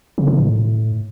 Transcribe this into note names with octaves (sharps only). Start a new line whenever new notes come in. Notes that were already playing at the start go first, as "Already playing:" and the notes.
C#3
D3
A2